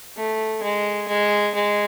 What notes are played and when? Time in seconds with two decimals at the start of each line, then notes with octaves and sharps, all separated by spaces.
0.17 A3
0.63 G#3
1.09 G#3
1.55 G#3